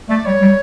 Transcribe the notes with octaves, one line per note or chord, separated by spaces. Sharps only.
A3 D5
G3 C#5
G3